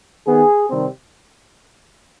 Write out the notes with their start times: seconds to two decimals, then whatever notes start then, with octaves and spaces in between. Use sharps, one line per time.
0.26 D#3 B3 G#4
0.70 C3 D#3 G3 C4